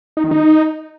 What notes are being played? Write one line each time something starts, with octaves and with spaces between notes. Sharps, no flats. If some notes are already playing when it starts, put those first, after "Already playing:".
D#4
D#3
D#4